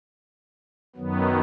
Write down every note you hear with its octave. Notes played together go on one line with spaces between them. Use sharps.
F#2 D#3 F#3 B3